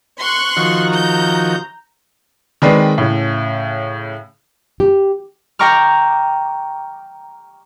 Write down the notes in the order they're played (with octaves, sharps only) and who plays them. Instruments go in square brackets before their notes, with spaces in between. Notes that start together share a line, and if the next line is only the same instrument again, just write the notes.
[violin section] C6 C#6 F#6
[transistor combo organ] D#3 F3 F#4
[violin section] A#5 G6
[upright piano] D#3 G#3 C4 B4 D5
A2 C#3
[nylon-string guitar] G4
[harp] G5 A#5 C#6 D6 F6